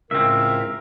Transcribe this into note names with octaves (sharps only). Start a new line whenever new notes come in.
C#2 A2 C4 A#4 E5